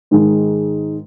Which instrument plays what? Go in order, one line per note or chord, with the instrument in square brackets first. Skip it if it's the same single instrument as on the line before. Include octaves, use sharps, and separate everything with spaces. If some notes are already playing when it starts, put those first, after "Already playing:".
[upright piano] G#2 D#3 G#3